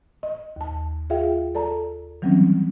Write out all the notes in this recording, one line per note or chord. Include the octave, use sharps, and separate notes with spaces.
D#5
D#2 A5
F4 G#4 E5 F5 G5
A4 D5 A5 A#5
D#3 E3 F#3 G3 C4 C#4